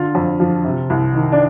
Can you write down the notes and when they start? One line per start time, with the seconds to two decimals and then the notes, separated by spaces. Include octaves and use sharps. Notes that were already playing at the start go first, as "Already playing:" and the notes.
Already playing: D3 F4
0.15 F2
0.40 F3
0.65 C3
0.90 C2
1.15 D#3
1.32 D4